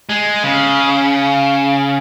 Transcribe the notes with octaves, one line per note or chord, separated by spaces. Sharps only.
G#3
C#3